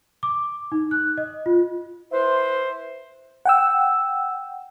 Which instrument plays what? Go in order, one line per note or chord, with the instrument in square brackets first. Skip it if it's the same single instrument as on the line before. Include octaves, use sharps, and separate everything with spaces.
[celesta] D6
D#4
F#6
D#5
F4
[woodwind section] E4 B4 C5
[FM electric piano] F#5 G5 E6